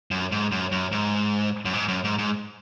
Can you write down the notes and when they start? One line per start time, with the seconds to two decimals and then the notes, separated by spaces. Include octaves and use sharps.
0.11 F#2
0.32 G#2
0.52 F#2
0.72 F#2
0.92 G#2
1.65 F#2
1.74 G#2
1.88 F#2
2.04 G#2
2.19 G#2